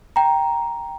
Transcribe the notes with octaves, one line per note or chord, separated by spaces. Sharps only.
G5 A#5